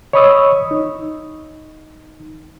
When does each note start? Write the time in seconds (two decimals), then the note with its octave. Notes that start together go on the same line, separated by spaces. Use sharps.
0.13 C#5 D#5 B5 C#6 D#6 E6
0.71 D#4